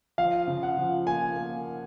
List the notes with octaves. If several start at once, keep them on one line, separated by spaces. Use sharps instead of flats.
F3 F5
C#3
F#5
F3
A#3 G#5
A#3